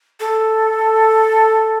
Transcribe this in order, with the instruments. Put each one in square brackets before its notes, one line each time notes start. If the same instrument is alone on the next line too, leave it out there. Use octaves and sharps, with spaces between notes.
[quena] A4